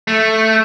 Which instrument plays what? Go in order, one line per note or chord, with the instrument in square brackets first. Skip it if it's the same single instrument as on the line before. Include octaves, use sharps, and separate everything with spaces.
[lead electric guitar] A3